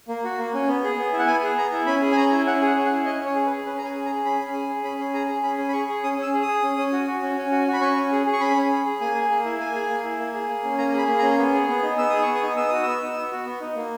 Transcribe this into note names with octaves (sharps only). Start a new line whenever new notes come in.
A#3
F#4
A#3
C#4
B3
G#4
B3
E4
F#5
B3 G#5
G#4
B3 A#5
E4
C#4 B5
G#4
G#5
C#4 A#5
E4
C#4 F#5
G#4 F#5
C#4
F#5
E4
C#4 D#5
C#4 C#5
G#4
B4
G#4
C#4 B4
A#5
C#4 G#5
G#4
A#5
G#4
C#4 B5
C#4
G#4
G#4
C#4 B5
C#4
G#4 A#5
G#4
C#4 B5
C#4
B5
G#4 C#6
G#4
C#4 D#6
C#4
E6
G#4
D#6
G#4
C#4
C#4
F#4
F#4
C#4
C#4
F#4
F#4
B5
C#4 C#6
C#4
G#4
G#4
C#6
C#4 B5
C#4
G#4
G#4
A#3 G#5
G#4
A#3
E4
A#3 G#5
G#4
A#3
E4
A#3
G#4
A#3
C#4
A#3 A#5
G#4 B5
A#3
A#5
C#4
B3
G#4
B3
D#4
B3 E6
G#4 D#6
C#6
B3
D#6
D#4
B3 E6
F#4 D#6
B3 E6
D#4
B3
F#4
B3
D#4
A#3